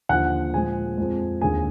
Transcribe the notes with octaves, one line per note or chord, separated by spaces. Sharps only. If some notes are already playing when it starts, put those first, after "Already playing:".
D#2 D3 F3 F#5 F#6
A#2 F3 G#3 G#4 G#5
F2 F3 G#3
D#2 D3 G#3 G#4 G#5